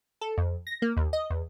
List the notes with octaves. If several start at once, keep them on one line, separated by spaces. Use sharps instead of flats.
A4
F2
A#6
A#3
D#2
D#5
E2